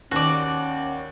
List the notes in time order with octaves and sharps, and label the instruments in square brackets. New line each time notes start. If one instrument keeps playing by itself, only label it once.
[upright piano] D#2 [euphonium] C#4 [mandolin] F#4 D5